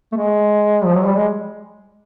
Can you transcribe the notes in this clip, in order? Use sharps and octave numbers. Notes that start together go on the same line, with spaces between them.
A3
G#3
F3
F#3
G3
G#3